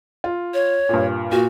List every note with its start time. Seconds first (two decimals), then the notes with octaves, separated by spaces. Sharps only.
0.24 F4
0.54 C#5
0.89 G2 A#2
1.32 A#2 F#4